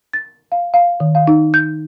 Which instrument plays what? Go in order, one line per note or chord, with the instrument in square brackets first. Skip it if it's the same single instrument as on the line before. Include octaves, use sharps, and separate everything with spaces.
[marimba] A6
F5
F5
D#3
F5
D#4
G6